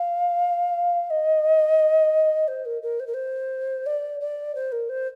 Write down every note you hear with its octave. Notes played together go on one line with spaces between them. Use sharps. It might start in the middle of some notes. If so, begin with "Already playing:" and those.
Already playing: F5
D#5
C5
A#4
A#4
C5
A#4
C5
D5
D5
C5
A#4
C5